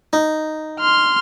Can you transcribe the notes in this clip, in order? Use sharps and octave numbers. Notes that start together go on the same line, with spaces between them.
D#4
C6 F6